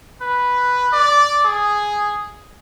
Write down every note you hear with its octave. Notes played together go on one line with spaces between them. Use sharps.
B4
D5
G#4